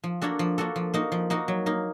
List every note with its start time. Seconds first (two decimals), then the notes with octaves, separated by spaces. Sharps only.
0.04 F3
0.22 A#3 D4 F#4 A4
0.39 F3
0.58 A#3 D4 F#4 A4
0.76 F3
0.94 A#3 D#4 F#4
1.12 F3
1.30 A#3 D#4 F#4
1.48 F#3
1.66 A#3 D#4